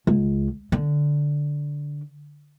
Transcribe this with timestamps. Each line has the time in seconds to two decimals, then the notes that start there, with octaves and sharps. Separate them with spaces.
0.07 C#2
0.72 D3